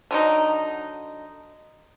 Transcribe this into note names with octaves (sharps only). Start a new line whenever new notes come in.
D3 F#3 D#4